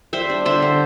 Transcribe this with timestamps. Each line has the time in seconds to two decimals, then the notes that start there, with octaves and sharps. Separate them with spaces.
0.13 G3 C5 E5
0.30 D4
0.45 D3 C5 E5
0.62 D3